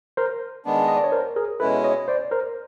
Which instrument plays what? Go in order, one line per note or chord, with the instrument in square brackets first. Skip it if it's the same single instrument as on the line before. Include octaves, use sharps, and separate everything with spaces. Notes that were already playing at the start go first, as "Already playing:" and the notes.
[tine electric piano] A#4 C5
[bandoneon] D#3 G#3 B3 D4
[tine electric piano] D#5
D5
C#5
A#4 C5
G#4 A#4
[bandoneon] B2 G#3 C#4 E4 [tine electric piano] A4 B4
[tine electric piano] C#5 D#5
C5 D5
A#4 C5